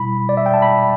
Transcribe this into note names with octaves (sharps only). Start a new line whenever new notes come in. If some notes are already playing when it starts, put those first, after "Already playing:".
Already playing: B2 G3 E4 B5
D5
E5
G5
A5
B5